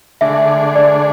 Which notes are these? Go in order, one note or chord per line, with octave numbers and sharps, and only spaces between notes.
D3 A3 D4 G#4 E5
D5